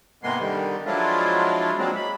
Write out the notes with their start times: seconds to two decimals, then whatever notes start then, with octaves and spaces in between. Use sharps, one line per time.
0.23 G#2 C3 G#3 A#3 B3 C6
0.39 D3 D#3 G3
0.86 F3 F#3 G#3 D4 E4 F4
1.78 F3 F#3 G#3 A#3 C4 D4
1.95 B5